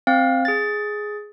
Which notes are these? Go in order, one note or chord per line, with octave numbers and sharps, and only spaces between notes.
C4 F5
G#4 A6